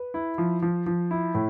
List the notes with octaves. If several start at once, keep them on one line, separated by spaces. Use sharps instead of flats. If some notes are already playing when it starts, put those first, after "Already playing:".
Already playing: B4
E4
F3
F3
F3
E4
A2